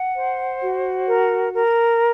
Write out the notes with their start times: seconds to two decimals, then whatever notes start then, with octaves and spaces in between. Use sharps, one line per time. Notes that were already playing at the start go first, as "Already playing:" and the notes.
Already playing: F#5
0.17 C5
0.62 F#4
1.07 A#4
1.53 A#4